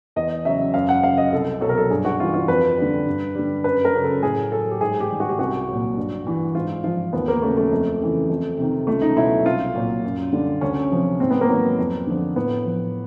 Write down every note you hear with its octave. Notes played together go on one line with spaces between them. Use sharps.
E2 D#5
C#3 F#3 E5
F#2 F5
F#5
C#3 F#3 F5
D#5
C2 A4
B2 F#3 A4
A#4
A4
G2 G#4
F#4
E3 G3 F4
F4
F2 B4
D3 G3
G2
D3 G3
F#2 B4
A#4
C#3 F#3
A4
A2 G#4
F#3 A4
G4
G#2 G#4
G4
D#3 G3
F#4
G4
C2 F#4
A#2 F#3
G2
E3 G3
G#2 F4
F3 F4
D#2 B3
A#3
C#3 F#3 A3
A3
F2
C#3 E3
F2
C3 D#3
C#2 A3
D#4
B2 F#3 E4
C2 F4
A#2 F#3
F#2
D3 G3
D2 C#4
C3 F3
G#2 C4
B3
A#3
D#3 F#3 B3
F2
D3 F3
A2 B3
F3